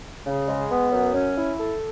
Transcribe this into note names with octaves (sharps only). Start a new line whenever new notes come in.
C#3
G#3
B3
F#2
C#4
E4
A4